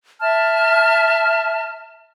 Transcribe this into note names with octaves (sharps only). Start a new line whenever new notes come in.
E5 A5 F6